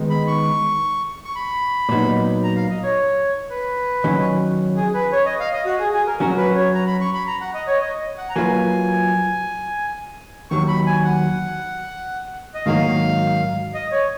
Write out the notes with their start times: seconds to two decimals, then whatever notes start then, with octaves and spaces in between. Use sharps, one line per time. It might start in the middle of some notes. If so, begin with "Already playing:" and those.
Already playing: D#3 G#3 B3 D#4
0.10 B5
0.27 C#6
1.25 C#6
1.35 B5
1.89 A#2 F#3 B3 D#4
2.43 A#5
2.56 F5
2.70 D#5
2.83 C#5
3.50 B4
4.04 D#3 F#3 C#4
4.76 G#4
4.94 B4
5.12 C#5
5.26 D#5
5.40 F5
5.52 D#5
5.65 F#4
5.79 G#4
5.93 G#4
6.07 A#4
6.20 F#3 C#4 F#4 A#4
6.37 B4
6.56 C#5
6.74 A#5
6.87 B5
7.01 C#6
7.14 B5
7.27 A#5
7.41 F#5
7.54 D#5
7.67 C#5
7.81 D#5
8.18 F#5
8.29 A#5
8.35 F#3 A#3 F4 B4 G#5
10.50 D#2 D#3 F#3 C#6
10.68 B5
10.87 G#5
11.04 F#5
12.54 D#5
12.66 G#2 D#3 F#3 A#3 F5
13.74 D#5
13.92 C#5